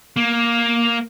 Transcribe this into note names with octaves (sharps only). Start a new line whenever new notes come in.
A#3